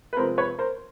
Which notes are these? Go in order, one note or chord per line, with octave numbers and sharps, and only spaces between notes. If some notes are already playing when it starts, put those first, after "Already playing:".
B4
C3 F3 G#3 C4 A#4 C5
B4 C#5
A#4 C5